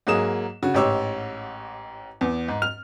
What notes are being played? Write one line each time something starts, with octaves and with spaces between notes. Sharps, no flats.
G#2 F#3 A#3 G#4 D#6 E7
C#3 F#4
A1 G#2 G4 C#5 D6 E6
E2
G#2
F6 F7